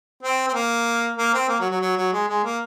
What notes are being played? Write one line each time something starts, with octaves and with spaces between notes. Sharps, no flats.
C4
C4
A#3
A#3
C4
A#3
F#3
F#3
F#3
F#3
G#3
G#3
A#3